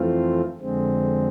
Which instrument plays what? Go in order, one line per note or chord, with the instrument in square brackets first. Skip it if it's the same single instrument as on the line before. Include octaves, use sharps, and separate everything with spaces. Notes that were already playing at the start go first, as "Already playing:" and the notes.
Already playing: [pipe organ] F2 E3 A3 C4 F4
F2 D3 G#3 C4